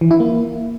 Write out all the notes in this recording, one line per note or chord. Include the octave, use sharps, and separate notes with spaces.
E3
E4
A#3